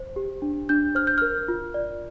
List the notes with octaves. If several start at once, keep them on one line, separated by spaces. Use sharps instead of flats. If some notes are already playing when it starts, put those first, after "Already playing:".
Already playing: C5
G4
D4
D4 G6
C5 F6
G6
A#4 F6
F4
D5